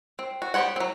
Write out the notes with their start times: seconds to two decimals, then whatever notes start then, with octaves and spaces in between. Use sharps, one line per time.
0.19 C4
0.42 F#4
0.54 B3 G4 C5 C#5 F#5
0.76 F#3 C4